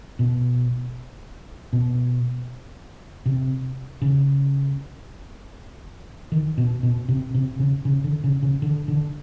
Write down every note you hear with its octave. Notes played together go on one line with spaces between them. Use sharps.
B2
B2
C3
C#3
D#3
B2
B2
C3
C3
C#3
C#3
D3
C#3
C#3
D3
D3